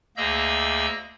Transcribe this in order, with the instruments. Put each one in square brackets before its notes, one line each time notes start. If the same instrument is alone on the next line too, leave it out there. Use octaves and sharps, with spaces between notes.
[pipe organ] D2 A#3 G#4 D#5 E6 G6